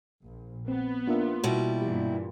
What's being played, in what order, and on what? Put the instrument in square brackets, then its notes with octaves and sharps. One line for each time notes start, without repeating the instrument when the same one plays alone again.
[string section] A#1
[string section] B3 [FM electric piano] C4
[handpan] A#3 D#4 F4 [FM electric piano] D4 A#4 E5
[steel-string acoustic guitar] B2 G3 E4 [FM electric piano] F#4
[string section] G2 A#2 E3 [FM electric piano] G4